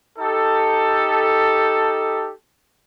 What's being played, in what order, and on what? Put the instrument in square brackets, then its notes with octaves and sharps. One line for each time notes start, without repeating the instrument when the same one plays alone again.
[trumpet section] D#4 G4 A4